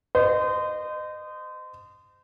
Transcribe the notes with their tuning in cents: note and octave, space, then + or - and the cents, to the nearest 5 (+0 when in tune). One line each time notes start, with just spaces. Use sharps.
C5 -30 D#5 -25